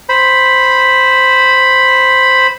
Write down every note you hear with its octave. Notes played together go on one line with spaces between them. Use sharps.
C5 B5